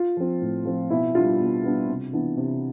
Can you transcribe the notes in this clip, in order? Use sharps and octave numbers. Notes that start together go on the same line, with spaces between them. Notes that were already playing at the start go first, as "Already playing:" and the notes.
Already playing: F4
F3 C4
A2
F3 C4
B2 E4
G3 B3 D4 F4
B2
G3 B3 D4
C3
E3 B3 D4
C3